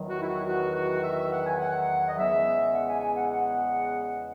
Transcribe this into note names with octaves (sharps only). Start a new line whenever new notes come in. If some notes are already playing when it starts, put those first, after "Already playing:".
Already playing: E2 D#3 F#3
F#4
E4
F#4
F#4
F#4
E5
E5
F#5
G#5
F#5
D#5
E2 C#3 G#3 B3 E5
F#5
G#5
G#5
F#5
F#5